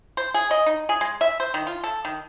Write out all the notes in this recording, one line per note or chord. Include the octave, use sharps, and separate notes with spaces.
C5
G#4
D#5
D#4
G#4
G#3
E5
C5
D#3
F4
A4
D#3